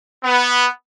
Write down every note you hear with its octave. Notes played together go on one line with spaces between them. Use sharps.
B3